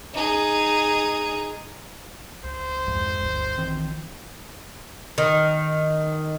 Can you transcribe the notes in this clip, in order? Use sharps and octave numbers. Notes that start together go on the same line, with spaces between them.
D#4 G#4
C#2 C5
G#1 F2 G#2
G1 D2
A#1 D#3 E3 C4
D#3